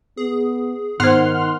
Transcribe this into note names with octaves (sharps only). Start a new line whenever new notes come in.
B3 G#4
G#2 D#3 B3 C5 F#5 C6 F6